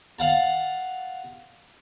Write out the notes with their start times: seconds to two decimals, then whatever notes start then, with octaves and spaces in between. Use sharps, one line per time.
0.19 F5 F#5 A5